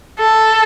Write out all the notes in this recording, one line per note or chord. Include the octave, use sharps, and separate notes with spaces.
A4